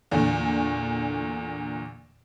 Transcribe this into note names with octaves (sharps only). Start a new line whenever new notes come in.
E2 A#2 D3 A3